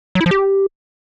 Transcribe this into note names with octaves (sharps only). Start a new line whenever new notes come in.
F#3
E4
F3
G4